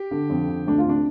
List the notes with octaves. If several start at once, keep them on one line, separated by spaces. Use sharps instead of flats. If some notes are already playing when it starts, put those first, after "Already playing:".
Already playing: G4
D3
F2
D3
D2 D4
F4
C3 D4